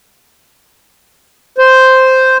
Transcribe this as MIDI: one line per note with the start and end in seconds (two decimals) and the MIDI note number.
1.58 2.37 72